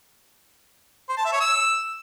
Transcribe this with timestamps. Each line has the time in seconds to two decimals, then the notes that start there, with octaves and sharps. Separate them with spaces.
1.09 C5
1.17 A5
1.25 E5
1.33 C#5
1.40 E6